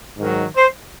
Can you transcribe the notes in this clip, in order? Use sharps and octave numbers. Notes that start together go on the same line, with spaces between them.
G#2 D#3 F#3
C5